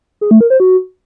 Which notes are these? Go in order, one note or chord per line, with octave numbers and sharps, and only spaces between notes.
G#4
A3
A#4
C5
F#4